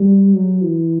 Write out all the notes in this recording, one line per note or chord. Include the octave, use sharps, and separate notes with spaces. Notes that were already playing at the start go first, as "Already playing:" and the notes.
Already playing: G3
F#3
E3